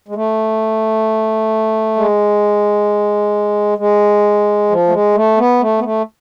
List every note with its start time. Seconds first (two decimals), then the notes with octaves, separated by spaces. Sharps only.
0.08 G#3
0.15 A3
1.96 G#3
3.78 G#3
4.70 F3
4.88 A3
4.92 G#3
5.15 A3
5.38 B3
5.61 A3
5.79 B3
5.84 A3